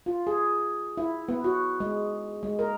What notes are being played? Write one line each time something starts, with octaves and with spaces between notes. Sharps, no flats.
F4
G#4
E4
B3
F#4
G#3
G#3
A#4